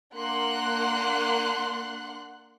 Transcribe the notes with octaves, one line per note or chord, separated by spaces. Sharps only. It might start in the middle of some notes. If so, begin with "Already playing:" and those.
A#3 D4 F#5 C6 F#6